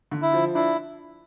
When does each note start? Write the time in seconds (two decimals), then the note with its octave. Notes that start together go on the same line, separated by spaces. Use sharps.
0.11 D3
0.22 E4
0.33 F3
0.55 D4 E4